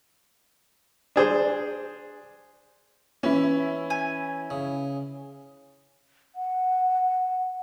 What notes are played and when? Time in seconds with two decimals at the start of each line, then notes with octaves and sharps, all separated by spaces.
1.16 D4 G#4 C5
3.23 E3 C#4 E4
3.90 G#5
4.50 C#3
6.35 F#5